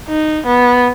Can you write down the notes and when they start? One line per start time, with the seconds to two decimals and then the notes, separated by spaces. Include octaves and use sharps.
0.09 D#4
0.46 B3